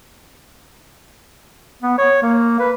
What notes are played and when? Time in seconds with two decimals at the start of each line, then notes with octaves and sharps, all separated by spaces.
1.83 B3
1.98 C#5
2.23 A#3
2.60 B4